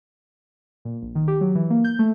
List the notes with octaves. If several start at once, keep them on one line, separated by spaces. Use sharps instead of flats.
A#2
A#1
D#3
G4
F#3
E3
A#3
G6
A3